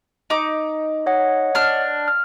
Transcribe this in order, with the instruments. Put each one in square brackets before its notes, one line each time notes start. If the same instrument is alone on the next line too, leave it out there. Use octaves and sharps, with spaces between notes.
[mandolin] D#4 D6
[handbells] C#5 D#5 F#5
[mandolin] D4 F6
[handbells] F6